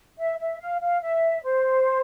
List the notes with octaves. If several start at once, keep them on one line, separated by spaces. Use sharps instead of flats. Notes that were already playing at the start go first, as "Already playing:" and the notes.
E5
E5
F5
F5
E5
C5